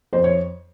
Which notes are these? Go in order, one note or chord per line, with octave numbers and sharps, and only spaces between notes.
F2 C5
C#5